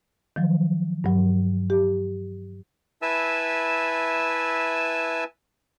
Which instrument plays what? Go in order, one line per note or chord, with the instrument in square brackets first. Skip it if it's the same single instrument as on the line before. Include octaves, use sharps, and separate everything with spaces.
[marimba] D#3 F3 F#3
G2 F#3
G4
[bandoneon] E4 B4 E5 G#5 A5 E6